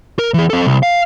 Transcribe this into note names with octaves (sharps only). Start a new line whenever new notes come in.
A#4
E3 G#4
C4 A4
C2
F5